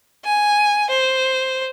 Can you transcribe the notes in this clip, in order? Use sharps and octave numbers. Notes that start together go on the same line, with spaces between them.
G#5
C5